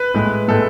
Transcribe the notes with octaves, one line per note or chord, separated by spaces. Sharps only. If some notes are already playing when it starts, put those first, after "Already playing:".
Already playing: B4
A2 G#3
A2 G#3 A4